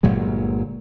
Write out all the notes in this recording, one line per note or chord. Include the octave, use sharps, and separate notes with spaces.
G1 A#2 F#3 G#3